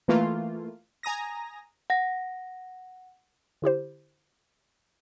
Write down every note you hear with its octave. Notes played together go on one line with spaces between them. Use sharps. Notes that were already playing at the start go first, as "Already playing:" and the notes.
E3 A3 A#3 F4
G#5 A#5 D#6 A#6
F#5 A#6
D3 E4 G4 C5